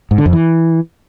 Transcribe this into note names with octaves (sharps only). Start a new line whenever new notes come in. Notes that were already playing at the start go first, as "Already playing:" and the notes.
G#2
D3
F2
E3